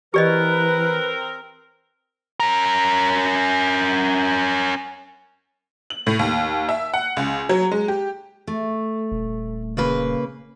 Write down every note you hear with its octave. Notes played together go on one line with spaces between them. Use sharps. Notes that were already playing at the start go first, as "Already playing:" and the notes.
E3 C4 G4 A#4 B4 D5 D#5
C#4 A#4
F#7
A2
D#2
E5
F#5
C#2
F#3
G#3
G4
A3
D#1
C#3 A#3 B4